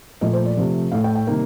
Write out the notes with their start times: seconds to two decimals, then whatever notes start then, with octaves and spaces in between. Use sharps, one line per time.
0.21 A#2 F3 A3 D#5
0.33 C5
0.45 D5
0.57 C3 F3 A3
0.92 A2 A3 F5
1.04 G5
1.15 G5
1.27 C3 D#3 G3 A#3